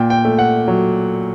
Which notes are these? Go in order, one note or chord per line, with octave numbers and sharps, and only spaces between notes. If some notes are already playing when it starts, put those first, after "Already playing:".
Already playing: A#2 G5
G5
A3
F#5
F#3